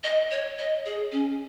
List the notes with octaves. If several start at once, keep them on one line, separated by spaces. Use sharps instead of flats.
D#5
C#5
D#5
G#4
C#4